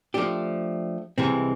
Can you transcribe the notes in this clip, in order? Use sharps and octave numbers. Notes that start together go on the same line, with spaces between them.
F3 A3 D4 G4
C2 C3 E3 G#3 C4